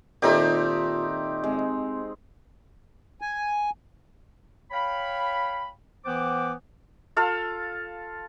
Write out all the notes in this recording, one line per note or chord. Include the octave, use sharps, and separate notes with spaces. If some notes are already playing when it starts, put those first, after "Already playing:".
A#2 D#3 A3 C4 D#4 F4 G4
G#3 C4
G#5
C#5 F5 G5 B5
E3 B3 C5 F#5 G5 D6
F4 A4 F5